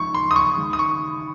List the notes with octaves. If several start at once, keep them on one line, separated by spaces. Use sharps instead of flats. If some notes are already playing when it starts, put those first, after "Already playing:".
Already playing: F3 G#3 D#4 C#6
C6
D#6
C#6
D#3 G#3 D#4
D#6
C#6